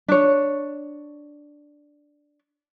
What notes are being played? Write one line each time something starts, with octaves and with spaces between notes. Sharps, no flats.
D4 C#5